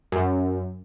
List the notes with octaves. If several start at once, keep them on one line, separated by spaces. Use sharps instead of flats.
F#2